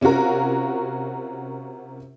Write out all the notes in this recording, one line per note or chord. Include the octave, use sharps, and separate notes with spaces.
C3 C#4 F4 F#4 A#4